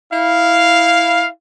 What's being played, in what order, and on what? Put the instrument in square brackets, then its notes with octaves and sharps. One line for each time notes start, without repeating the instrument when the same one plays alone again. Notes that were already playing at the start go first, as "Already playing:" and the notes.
[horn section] E4 F5